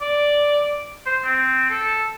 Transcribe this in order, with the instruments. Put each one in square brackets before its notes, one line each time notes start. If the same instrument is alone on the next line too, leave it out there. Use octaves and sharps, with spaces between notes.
[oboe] D5
C5
C4
A4